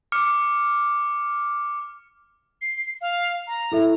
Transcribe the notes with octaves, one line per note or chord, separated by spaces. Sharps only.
D6 F6 C#7
C7
F5
A#5
E4 A4 E5